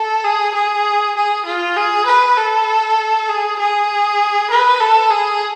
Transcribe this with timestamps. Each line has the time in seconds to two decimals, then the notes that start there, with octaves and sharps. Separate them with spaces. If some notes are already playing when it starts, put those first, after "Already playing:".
Already playing: A4
0.24 G#4
0.54 G#4
1.16 G#4
1.46 F4
1.76 G#4
2.06 B4
2.37 A4
3.29 G#4
3.59 G#4
4.50 B4
4.80 A4
5.11 G#4